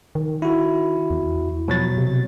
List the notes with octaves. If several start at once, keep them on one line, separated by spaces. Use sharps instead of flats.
D#3
E4 F#4
E2
B2 F3 F#3 A6
C3